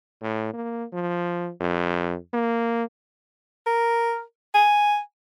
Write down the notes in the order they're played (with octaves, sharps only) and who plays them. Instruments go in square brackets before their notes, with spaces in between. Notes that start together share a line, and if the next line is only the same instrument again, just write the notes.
[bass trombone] A2
A#3
F3
F2
A#3
[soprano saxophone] A#4
G#5